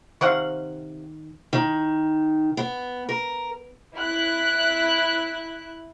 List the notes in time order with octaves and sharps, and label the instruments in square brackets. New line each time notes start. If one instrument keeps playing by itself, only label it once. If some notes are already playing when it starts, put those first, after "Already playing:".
[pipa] C3 C4 F#5 [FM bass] D#3 [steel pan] F5 C#6
[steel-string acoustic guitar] D#3
B3
A#4
[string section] E4 F#6